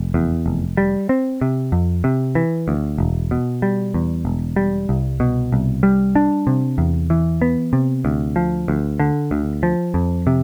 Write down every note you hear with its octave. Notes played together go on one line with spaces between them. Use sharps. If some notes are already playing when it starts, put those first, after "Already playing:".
Already playing: F1
E2
F1
G3
C4
C3
F2
C3
E3
D2
E1
B2
G3
E2
E1
G3
C2
B2
C2
G3
D4
C3
E2
E3
B3
C3
D2
F3
D2
D3
D2
F3
F2
C3